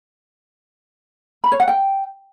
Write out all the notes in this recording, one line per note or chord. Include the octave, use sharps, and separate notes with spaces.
B5
C#5
F#5
G5